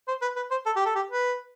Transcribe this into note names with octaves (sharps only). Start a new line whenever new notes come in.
C5
B4
B4
C5
A4
G4
A4
G4
B4